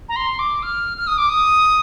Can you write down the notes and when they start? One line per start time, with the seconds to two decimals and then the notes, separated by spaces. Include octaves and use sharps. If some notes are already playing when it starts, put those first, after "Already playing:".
0.09 A#5
0.16 C6
0.39 D6
0.63 F6
0.97 F6
1.07 D#6
1.18 D6
1.29 D#6